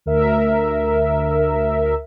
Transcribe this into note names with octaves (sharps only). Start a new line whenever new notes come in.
D2 A#4 E5